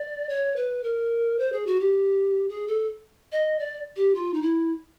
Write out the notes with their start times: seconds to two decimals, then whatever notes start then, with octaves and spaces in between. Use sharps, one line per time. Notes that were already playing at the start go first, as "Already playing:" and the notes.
Already playing: D5
0.29 C#5
0.56 B4
0.84 A#4
1.39 C5
1.52 G#4
1.67 F#4
1.80 G4
2.49 G#4
2.68 A4
3.32 D#5
3.59 D5
3.96 G4
4.15 F4
4.34 D#4
4.42 E4